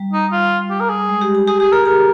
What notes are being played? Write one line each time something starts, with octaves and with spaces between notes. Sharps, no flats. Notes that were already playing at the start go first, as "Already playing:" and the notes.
Already playing: G3
D#4
F4
G4
A#4
G#4
G#3
G4
G4
G4 G#4
G4 G#4
G#4 A#4
G4 A#4